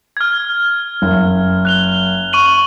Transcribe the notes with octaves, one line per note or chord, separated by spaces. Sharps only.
F6 G#6
F#1
F#6 F7 G7
C#6 D#7 F#7